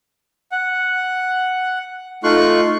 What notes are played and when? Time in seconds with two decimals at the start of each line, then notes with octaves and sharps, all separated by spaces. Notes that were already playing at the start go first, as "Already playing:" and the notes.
0.52 F#5
2.24 A3 D#4 F4 C6 C#6 F#6